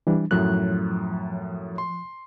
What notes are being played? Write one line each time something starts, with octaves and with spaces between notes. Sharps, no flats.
E3 G3 D4
F#2 A2 F3 F#3 F#6
C6